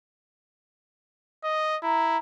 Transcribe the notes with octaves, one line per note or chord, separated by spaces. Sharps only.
D#5
E4 A#5